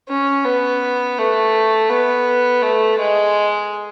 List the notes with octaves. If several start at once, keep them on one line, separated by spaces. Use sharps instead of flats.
C#4
B3
A3
B3
A3
G#3